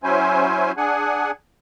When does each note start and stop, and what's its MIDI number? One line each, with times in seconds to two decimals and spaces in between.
0.04 0.72 54
0.04 0.72 61
0.04 0.72 64
0.04 0.72 72
0.04 0.72 80
0.77 1.31 62
0.77 1.31 68
0.77 1.31 78
0.77 1.31 80